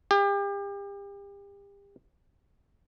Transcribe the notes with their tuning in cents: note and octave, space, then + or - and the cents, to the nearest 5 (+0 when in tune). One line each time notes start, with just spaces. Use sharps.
G4 +35